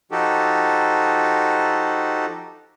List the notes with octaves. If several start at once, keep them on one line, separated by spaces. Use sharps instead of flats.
F3 D#4 F#4 G4 A4